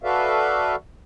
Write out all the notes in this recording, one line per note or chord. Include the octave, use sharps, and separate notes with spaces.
F#4 A4 B4 D5 E5 F5